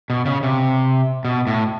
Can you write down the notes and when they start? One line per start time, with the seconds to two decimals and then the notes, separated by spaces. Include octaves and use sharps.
0.10 B2
0.26 C#3
0.43 C3
1.25 B2
1.47 A2